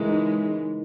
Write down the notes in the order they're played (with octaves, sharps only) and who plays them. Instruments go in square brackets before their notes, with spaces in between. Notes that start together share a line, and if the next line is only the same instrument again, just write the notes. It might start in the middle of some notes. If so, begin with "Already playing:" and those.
Already playing: [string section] C#3 E3 G#3 [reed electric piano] E4 A#4
[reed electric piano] D#4